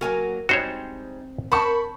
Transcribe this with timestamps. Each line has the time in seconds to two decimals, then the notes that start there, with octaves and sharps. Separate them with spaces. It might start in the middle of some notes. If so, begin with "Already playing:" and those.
0.01 F#3 A#3 F#4 A#4 G#5
0.49 G3 G#3 C4 D#4 F#4 C5 C#5
1.52 A#4 C5 F#5 A5 B5 C#6